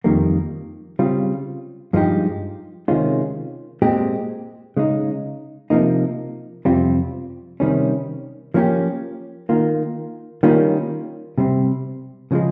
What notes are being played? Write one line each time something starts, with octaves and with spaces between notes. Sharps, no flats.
F2 D#3 G3 A#3
C#3 G3 C4 F4
G2 F3 G#3 D#4 G4
C3 D#3 G#3 C#4 F4
A#2 G#3 C4 G4
C#3 G#3 D#4
C3 F3 A#3 D#4
F2 C3 G3 C4 F4
C3 D#3 G3 C#4
F3 A#3 C#4 G4
D#3 A#3 F4
D#3 G3 A#3 C#4 F4
C3 G3 C4
C#3 F3 G#3